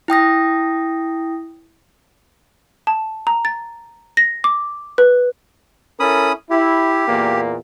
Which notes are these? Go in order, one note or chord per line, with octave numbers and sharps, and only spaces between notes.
E4 G5 D#6 A#6
A5
A#5
A6
A#6
D6
B4
C#4 E4 A4 A#4 B5 D#6
E4 G4
E2 A#2 A#3